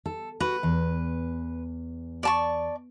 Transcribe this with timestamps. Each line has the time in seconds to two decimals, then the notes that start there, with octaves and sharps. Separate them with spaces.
0.06 A4
0.40 F#4 B4
0.63 E2
2.23 D5 A5 C#6